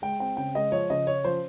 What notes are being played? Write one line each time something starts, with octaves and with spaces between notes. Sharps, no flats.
G#3 G5
C4 G5
C#3 G5
G#3 D#5
F3 C#5
C#3 D#5
C#4 C#5
F3 C5